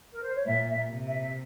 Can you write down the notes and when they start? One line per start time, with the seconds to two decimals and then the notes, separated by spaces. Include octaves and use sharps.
0.12 A#4
0.22 C5
0.35 C#5
0.45 A#2 E5
0.69 E5
0.91 C3
1.06 E5
1.22 E5